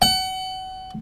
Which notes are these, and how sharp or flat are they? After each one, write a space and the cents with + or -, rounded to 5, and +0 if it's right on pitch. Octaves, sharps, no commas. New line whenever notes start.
F#5 +30